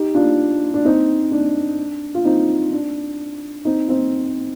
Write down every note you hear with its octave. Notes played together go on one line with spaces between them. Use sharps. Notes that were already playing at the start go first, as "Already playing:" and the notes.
Already playing: D#4 G4
D4 F4
D4
C4 D#4
D4
F4
C4 D#4
D4
C4 D#4
C4 D#4